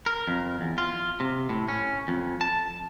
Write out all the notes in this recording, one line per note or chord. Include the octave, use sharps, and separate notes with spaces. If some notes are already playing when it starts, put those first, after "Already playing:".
A#4
F2
E2
F4
C3
A2
C#4
F2
A5